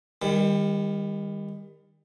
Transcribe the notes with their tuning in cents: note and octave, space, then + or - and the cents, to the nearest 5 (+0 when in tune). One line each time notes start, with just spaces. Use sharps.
D#3 +0 G3 +30